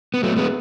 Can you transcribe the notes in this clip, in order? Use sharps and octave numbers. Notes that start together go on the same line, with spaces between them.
B3
F#3 A3
G#3 B3